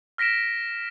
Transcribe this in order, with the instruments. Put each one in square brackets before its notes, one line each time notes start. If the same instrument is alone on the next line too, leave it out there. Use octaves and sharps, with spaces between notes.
[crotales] F6 A#6 B6 D7 E7